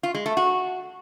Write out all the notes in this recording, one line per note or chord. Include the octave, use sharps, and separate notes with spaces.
F4
G#3
A3
F#4